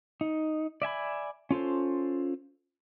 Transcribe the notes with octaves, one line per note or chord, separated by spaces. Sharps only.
D#4
D5 E5 G#5 B5
C#4 F4 A4 C5